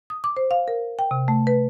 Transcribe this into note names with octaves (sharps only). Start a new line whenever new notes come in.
D#6
D6
C5
F5
A#4
G5
C3
A3
B4